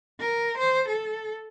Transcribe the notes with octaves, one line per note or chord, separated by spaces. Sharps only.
A#4
C5
A4